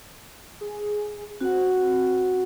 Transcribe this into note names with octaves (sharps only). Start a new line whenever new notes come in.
G#4
C4 F#4 F#5